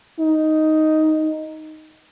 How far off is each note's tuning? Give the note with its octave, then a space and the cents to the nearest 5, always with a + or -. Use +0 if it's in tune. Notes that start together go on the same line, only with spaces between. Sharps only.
D#4 +5